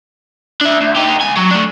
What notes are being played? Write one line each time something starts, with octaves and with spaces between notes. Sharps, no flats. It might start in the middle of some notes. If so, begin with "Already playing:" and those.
D4 E5
D2
D#4 G4
C#2 G#5
F#3
A3 D4